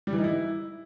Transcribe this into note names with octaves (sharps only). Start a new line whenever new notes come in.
G3
E3
D#4
E4